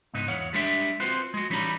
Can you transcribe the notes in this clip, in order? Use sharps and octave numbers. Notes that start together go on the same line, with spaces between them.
C#2 G#2 B3 D#4
E2 C#5 F5 F#5
G3 G#3 D4 G4 C5 E5
C4 F4 F#4 B4 C5
G#3 F#4
E3 G3 C#4 D#4 A#5 B5